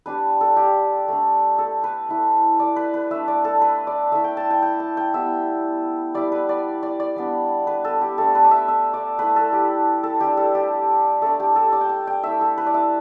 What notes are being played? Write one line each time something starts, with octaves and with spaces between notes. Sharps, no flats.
G3 D4 B4
A4
G4
A3 D4
A4
B4
A3 E4
D5
B4
B4
A3 D4 E5
D5
A4
B4
D5
A3 E4 E5
G5
A5
G5
G5
A5
G5
G3 B3 E4 E5
G3 E4 D5
B4
D5
D5
D5
G3 B3 D4
B4
A4
G4
A3 D4 A4
B4
D5
E5
E5
D5
A3 E4 B4
A4
G4
A4
G3 D4 G4
A4
G4
A3 D4 A4
G4
A4
D5
G5
A5
G5
A3 E4 E5
A4
B4
D5
E5